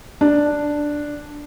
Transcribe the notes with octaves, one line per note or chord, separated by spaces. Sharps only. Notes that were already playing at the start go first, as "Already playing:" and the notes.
D4